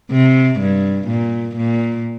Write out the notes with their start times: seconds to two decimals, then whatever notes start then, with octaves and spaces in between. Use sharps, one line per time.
0.11 C3
0.60 G2
1.08 A#2
1.56 A#2